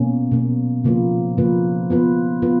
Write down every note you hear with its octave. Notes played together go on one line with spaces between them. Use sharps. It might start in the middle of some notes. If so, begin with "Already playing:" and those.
Already playing: B2 A#3 C#4
B2 A#3 C#4
C#3 F3 A#3 F4 B4
C#3 F3 A#3 F4 B4
B3 F4 B4
B3 F4 B4